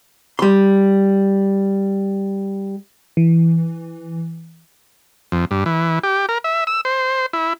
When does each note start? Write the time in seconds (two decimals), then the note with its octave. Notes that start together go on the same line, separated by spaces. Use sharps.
0.39 G3 C6
3.17 E3
5.32 F2
5.51 G2
5.66 E3
6.03 G4
6.29 A#4
6.44 E5
6.67 E6
6.85 C5
7.33 E4